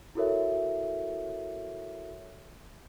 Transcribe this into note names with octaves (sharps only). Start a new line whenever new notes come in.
E4 F#4 A4 A#4 C#5 E5